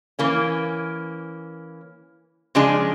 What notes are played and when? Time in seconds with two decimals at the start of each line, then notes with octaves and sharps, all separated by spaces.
0.19 E3 A#3 C#4
2.55 C#3 F3 G#3 D4 G#4